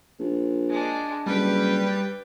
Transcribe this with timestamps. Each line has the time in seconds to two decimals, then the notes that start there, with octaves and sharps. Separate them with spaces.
0.19 A#1
0.69 G#3 D4
1.26 F#1 G3 B4 G5